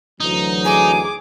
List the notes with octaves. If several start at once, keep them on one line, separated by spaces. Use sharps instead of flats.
D2 E3 F#3 D#4
G#4 G#5 D6